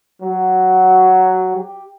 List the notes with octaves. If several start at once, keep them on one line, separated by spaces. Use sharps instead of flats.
F#3
G4